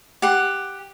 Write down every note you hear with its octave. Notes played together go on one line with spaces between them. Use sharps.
G4 F#5